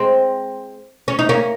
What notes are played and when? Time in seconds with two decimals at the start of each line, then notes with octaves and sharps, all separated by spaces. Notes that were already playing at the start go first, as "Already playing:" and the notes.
Already playing: G#3 C4
1.08 C#4
1.19 D#4
1.29 A#3 C#4